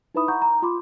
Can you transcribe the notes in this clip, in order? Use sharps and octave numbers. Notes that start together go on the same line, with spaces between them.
D#4 E4 B4 E5 B5 D#6
F#5 A#5 B5 C#6 G6
A#5
F4 B5 C6 D6